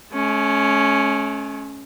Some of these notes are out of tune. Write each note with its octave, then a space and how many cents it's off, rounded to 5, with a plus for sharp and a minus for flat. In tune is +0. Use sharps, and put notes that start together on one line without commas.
A3 -45 C#4 +0